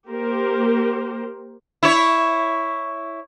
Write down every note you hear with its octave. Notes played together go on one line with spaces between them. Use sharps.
A#3 G4 A#4 C5
E4 C#5